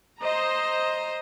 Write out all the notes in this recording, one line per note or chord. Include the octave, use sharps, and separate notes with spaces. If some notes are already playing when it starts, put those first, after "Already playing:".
C5 D#5 A#5